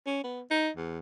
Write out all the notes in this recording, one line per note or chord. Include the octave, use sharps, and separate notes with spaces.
C#4
B3
D#4
E2